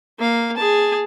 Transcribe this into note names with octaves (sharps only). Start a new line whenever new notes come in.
A#3 F5
G#4 A5